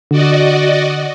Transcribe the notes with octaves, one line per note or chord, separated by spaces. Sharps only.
D3 F#4 D5 D#5